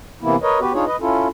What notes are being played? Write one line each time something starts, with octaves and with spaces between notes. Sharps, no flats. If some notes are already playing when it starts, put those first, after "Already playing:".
C3 E3 A#3 B3 E4
A#4 B4 C#5 D#5
B3 F#4 G4 B4
D4 D#4 F4 G#4 C#5
B4 D#5
C#4 E4 F4 A4